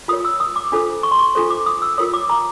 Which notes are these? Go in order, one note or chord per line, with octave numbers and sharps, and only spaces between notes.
F4 A#4 C#5 D#6
E6
D#6
D6
D4 F4 A4 C5
C#6
C6
C#6
D4 F4 A4 C5 C#6
D6
D#6
E6
F4 A#4 C#5 D#6
D6
A#5